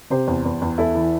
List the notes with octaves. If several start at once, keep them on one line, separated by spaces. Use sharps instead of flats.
C3 G4 C5
E2
E2
E2
E2 E4 A4
E3